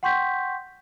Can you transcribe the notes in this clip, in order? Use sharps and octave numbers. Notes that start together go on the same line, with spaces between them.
F#5 G5 C6 C#6 G6 B6